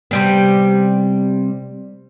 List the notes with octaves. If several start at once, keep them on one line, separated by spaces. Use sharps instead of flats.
C3 G3 B3